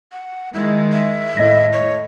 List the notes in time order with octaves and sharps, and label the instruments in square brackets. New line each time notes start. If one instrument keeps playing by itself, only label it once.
[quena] F#5
[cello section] D#3 G#3 [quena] E4
[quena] E5
[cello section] A2 [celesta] D#5 A#6
[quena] C#5